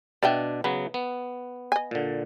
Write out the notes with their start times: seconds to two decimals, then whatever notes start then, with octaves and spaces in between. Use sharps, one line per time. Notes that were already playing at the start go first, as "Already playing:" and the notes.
0.23 B2 D4 D5 E5 G5
0.64 C#3 F#3 B3 B4
0.94 B3
1.72 D#5 G#5
1.91 A#2 D3